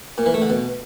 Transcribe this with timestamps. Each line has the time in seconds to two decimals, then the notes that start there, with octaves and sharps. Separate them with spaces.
0.18 A#2
0.26 E3
0.34 A3
0.42 D3
0.50 B2